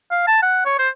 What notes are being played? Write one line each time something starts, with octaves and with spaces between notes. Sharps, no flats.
F5
A5
F#5
C#5
C5